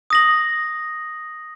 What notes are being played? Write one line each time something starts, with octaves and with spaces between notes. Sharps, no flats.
D#6 A#6 F#7